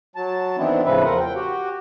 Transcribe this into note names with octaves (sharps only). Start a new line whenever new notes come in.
F#3 A5
D#3 E3 B3 C4 D4 E4
A2 C#3 F3 C4 B4 E5
E2 F3 F4 A#4 F#5
G5
F#4 G4